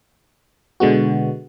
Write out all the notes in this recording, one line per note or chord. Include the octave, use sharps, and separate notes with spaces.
B2 D3 G#3 B3 F#4